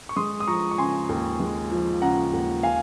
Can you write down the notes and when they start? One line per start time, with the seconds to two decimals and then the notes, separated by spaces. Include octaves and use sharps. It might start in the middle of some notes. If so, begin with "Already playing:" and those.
0.09 C#6
0.16 G#3 C6 D#6
0.40 D#6
0.47 F3 A#5 C#6
0.71 C#6
0.78 C#3 G#5 C6
1.09 D#2
1.40 G#3
1.71 F3
2.02 C#3 F#5 A#5
2.33 D#2
2.63 F5 G#5